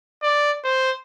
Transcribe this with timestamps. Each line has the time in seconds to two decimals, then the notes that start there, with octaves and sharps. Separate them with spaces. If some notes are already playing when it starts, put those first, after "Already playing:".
0.23 D5
0.64 C5